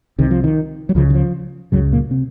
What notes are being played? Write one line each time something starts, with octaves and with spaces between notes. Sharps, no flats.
C2 C3 D#3
F3
D#3
F#3
C#2 C#3 F3
D#3
F3
C#2 F#2 C#3 F#3
A#2 A#3
C3 C4